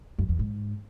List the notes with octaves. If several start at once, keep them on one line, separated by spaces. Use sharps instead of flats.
F#2
E2
G#2